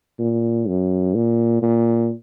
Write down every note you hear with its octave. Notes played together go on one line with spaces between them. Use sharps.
A#2
F#2
A#2
A#2